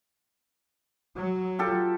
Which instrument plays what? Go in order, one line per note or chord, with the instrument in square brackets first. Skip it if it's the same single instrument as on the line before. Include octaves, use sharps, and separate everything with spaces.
[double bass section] F#3
[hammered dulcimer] F4 G4 A4